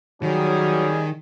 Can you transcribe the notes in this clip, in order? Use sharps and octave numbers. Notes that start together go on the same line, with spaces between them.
D#3 F#3 G3 C#4 G#4